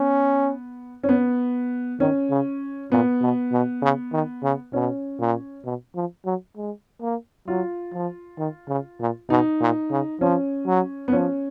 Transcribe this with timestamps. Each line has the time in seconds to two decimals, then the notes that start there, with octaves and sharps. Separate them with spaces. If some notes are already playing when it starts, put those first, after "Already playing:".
Already playing: B3 C#4
1.04 C#4
1.09 B3
2.00 D#3 C#4
2.30 C#3
2.92 A#2 B3
3.22 B2
3.52 B2
3.82 C#3
4.13 D#3
4.43 C#3
4.73 B2 C#4
5.19 A#2
5.65 B2
5.95 F3
6.26 F#3
6.57 G#3
7.02 A#3
7.48 F#3 F4
7.93 F3
8.39 D#3
8.69 C#3
9.00 A#2
9.30 B2 D#4
9.61 A#2
9.91 C#3
10.21 F3 C#4
10.67 F#3
11.08 B3
11.12 F3 C#4